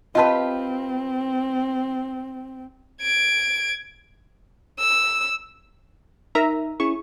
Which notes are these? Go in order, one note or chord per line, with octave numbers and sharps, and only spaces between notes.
C4 F4 G4 B4 D#5 A5
G#6 D7
E6
D#4 A#4 E5 A#5
C#4 E4 G#4 C#6